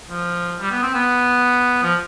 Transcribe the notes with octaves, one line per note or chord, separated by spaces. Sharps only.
F3
G3
B3
C4
B3
F3